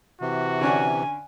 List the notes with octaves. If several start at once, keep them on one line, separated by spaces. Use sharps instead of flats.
C3 E3 F#4
D3 C#4 D4 G#5